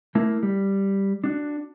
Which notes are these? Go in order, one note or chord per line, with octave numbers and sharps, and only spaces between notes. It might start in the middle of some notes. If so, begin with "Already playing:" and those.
A3 A#3 E4
G3
D4 F#4